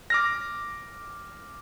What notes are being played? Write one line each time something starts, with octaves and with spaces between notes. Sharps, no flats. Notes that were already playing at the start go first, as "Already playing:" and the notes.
D6 F6 A#6